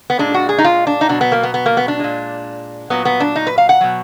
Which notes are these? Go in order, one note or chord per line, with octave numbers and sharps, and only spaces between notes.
B3
A#2 G#3 D4
F#4
G#4
D#4
F4
D4
D#4
B2 F#3 D4
B3
A#3
B3
B3
A#3
B3
D4
A#2 G#3
A#2 F#3 B3
B3
D4
D#4
B4
F5
F#5
B2 F#3